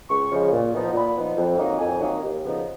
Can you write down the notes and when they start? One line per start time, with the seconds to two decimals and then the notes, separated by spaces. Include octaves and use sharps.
0.09 C#2 C#6
0.31 C#3 F3 G#3
0.52 A#2
0.73 F3 B3 D#4
0.94 A#2 B5
1.15 F3 B3 D#4
1.37 F2
1.58 D#3 F#3 A#3 D#4
1.79 F2 G#5
2.00 D#3 F#3 A#3 D#4
2.22 D#2
2.43 C#3 F3 B3 D#4